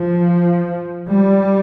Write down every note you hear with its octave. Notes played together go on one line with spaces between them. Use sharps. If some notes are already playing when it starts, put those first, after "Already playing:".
Already playing: F3
G3